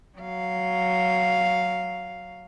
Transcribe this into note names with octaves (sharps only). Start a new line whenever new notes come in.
F#3 F5